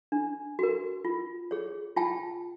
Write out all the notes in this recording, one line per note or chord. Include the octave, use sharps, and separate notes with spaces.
D4
F#4 A#4
F4
G#4 C#5
F4 G5 A5